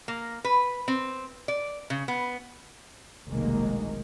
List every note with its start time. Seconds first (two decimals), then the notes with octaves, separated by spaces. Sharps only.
0.08 A#3
0.44 B4
0.88 C4
1.48 D5
1.90 C#3
2.08 B3
3.28 F1 B1 D#3 G#3 A#3